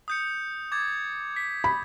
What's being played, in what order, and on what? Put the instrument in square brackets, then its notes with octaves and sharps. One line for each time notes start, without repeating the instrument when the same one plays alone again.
[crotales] D#6 G6 C#7
D6 G#6 A6
B6
[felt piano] B5